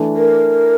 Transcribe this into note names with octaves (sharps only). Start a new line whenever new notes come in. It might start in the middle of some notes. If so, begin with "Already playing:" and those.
Already playing: E3 A3 D4
A#4